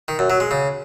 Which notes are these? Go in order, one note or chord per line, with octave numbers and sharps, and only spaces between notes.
D#3
F#2
F#3
G#3
C#3